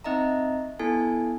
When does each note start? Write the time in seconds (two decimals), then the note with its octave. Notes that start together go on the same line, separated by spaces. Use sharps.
0.04 C4 D#4 D#5 E5 A#5
0.79 B3 E4 A4 G#5